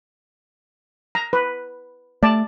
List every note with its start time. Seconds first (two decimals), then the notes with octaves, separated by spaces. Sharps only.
1.15 A#5
1.33 B4
2.23 A3 D5 A5